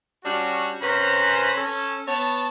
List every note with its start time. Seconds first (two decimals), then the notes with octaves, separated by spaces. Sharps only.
0.24 G3 C#4 D4 F#4
0.82 F#2 C3 C#4 B4 C5 A#5
1.57 C#4 A4
2.08 B3 C#5 A5